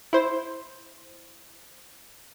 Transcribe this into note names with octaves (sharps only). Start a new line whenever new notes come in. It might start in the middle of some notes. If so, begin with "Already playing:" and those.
E4 C5